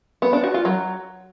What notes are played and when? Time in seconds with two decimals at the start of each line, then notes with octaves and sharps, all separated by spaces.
0.22 B3
0.33 D4
0.44 F#4
0.54 F4
0.65 F#3